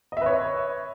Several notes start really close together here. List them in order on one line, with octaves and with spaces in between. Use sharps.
D#5 E5 B4 C#5